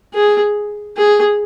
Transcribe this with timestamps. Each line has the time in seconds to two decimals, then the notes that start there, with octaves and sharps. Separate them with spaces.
0.14 G#4
0.97 G#4